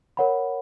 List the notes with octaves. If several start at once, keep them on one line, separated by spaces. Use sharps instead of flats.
A#4 C#5 F#5 B5